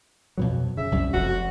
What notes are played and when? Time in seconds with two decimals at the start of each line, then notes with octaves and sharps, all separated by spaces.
0.37 F2 B2 F#3
0.77 C#3 E5
0.92 C2 F#2 G3
1.13 F1 F2 F#4